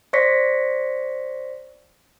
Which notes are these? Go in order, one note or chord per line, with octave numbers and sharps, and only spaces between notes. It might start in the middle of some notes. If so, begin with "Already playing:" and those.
C5 D5 C#6 A#6 B6 C#7